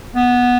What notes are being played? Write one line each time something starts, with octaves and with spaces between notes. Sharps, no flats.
B3